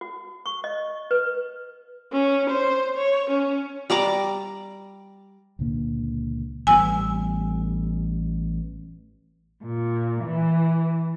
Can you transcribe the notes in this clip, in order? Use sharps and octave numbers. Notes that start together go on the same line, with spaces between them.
F#4
C#6
D#5
B4
C#4
C5
C#5
C#4
G3 D5 A#5 D6
C#2 A#2 D3 A#3
A1 G3 B3 G#5 E6
A#2
E3